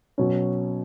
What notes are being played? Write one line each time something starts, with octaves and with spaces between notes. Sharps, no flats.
B2 F#3 C#4